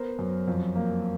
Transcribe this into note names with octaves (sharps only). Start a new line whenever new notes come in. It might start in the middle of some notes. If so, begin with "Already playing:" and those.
Already playing: B3 A#4 C5
F#2
F2
A#3